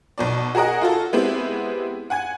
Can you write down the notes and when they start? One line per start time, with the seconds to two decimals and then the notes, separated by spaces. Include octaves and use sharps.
0.18 B1 B2 D5
0.55 F#4 G#4 A#4 D#5 F#5
0.81 F4 F#4 A4
1.13 G#3 B3 C4 E4 G4
2.10 F#5 G#5 G#6